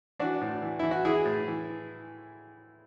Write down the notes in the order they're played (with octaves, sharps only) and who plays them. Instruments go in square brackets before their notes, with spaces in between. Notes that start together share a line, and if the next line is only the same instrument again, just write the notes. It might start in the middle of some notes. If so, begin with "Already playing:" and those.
[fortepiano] E3 D4 F#4
A2
E3
E3 E4
F#4
E3 E4 G#4
A2
E3